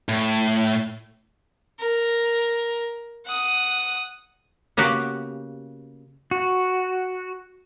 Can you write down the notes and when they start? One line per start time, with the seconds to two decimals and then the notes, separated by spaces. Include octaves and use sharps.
0.09 A2
1.80 A#4
3.26 F#5 D#6
4.77 C#3 A#3 B3 F#4 G4
6.31 F#4